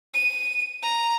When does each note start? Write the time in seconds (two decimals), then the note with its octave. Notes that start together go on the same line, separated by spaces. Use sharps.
0.14 D#7
0.83 A#5